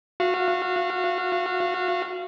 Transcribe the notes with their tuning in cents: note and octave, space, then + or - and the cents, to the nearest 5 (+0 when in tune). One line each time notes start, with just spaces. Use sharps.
F#4 -25 F5 -25